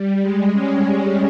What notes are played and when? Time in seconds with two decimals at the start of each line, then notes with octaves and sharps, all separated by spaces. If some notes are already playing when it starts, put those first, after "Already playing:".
Already playing: G3
0.21 G#3
0.52 C#4
0.81 C#4